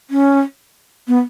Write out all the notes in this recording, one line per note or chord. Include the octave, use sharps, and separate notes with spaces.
C#4
B3